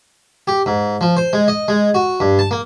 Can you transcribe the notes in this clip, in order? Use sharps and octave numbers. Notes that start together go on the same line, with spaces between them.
G4
G#2
F3
C5
G#3
D#5
G#3
F#4
G2
A5
A#3